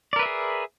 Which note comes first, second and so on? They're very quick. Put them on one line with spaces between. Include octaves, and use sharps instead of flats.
D5 A#4 B4 E5 G#4